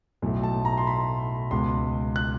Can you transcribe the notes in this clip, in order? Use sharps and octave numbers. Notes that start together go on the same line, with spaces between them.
B1 A2 F#3 A3
A5
A#5
C6
B5
C#2 B2 G#3 C6
F#6